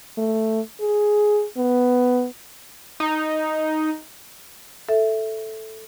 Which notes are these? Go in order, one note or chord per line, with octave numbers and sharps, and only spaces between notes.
A3
G#4
B3
D#4
A4 E5